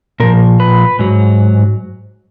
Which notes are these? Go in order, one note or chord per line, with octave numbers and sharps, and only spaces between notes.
A#2 F3 A#4
B4
G#2 F#3